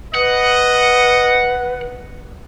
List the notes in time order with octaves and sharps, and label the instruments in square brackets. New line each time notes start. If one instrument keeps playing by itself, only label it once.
[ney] B4 [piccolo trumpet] D#5 [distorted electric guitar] F#5